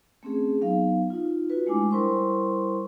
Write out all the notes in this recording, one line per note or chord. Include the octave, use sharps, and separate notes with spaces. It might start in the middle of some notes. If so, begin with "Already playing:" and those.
A3 C4 C#4 G#4
F#3 B3 D#4 F5
D#4 F4
F4 F#4 B4
G#3 A3 D4 E4 G#5 D6
G3 E4 A#4 C5 C6 C#6